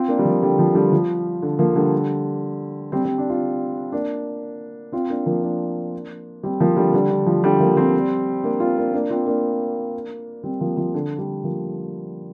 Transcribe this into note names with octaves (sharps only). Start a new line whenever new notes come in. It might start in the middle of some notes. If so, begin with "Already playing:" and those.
Already playing: C4 F4
A#3 D4
G3
F3 A#3
D3 G3
F3
D3 G3
F3
D3
F3 A#3
D3 G3
G3 C4
G3 C4
D4
C4 F4
A#3 D4
C4 F4
A#3 D4
F3 A#3
A#3 D4
G3 C4
F3 A#3
D3 G3
D3 G3
D3
F3
D3 G3
F3 A#3
G3 C4
A#3 D4
C4 F4
A#3 D4
A#3 D4
C4 F4
A#3 D4
G3 C4
F3 A#3
F3
D3
D3 G3
F3 A#3